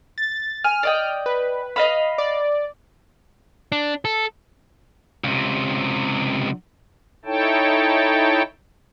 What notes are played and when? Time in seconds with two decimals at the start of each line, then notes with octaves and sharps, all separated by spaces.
0.18 A6
0.64 G#5 F6
0.83 D5 D#5 G5
1.26 B4
1.76 D#5 F5 B5
2.18 D5
3.72 D4
4.05 A4
5.24 C#2 C3
7.25 D#4 E4 A4 C#5 G5 A5